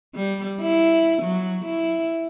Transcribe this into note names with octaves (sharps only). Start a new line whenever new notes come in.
G3
E4
F#3
E4